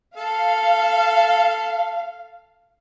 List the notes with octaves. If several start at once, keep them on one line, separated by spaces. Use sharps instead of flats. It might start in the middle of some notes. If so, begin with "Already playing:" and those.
A4 F5